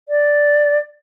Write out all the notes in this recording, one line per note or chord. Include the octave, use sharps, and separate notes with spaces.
D5